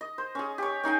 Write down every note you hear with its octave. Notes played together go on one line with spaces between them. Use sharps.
D#5
C5
C#4 G#4
G4 C#5
C#4 D#4 G#4 G5